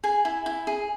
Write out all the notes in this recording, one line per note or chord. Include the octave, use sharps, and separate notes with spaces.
G#4 G#5
E4
E4
G#4